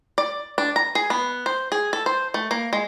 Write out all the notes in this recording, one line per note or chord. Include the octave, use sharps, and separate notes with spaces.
D5
D4
A#5
G#4
B3
C5
G#4
A4
C5
A3
A#3
G#3